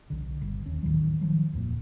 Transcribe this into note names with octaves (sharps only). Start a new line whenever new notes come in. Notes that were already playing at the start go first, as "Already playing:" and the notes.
B1 D3
G1
D#2 C#4
A1 D#2 D#3 F#3
D#3 F3 F#3
D1 F2 A#2 A#3